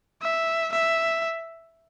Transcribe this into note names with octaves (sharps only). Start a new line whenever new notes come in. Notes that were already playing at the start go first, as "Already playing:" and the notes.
E5
E5